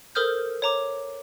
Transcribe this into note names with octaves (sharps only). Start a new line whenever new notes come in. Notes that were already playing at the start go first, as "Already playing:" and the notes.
A4 A#4 C5 D#6 F6 G6
C#5 A#5 D6